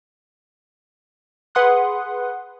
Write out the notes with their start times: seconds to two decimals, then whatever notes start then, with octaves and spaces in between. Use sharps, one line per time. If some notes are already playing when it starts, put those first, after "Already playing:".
1.55 G#4 B4 F#5 C6 D#6 F#6